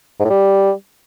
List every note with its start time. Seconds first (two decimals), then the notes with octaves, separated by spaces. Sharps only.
0.20 G#2
0.25 A2
0.30 G3